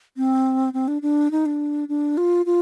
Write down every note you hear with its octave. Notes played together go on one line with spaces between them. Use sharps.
C4
C4
D4
D4
D#4
D4
D4
F4
F4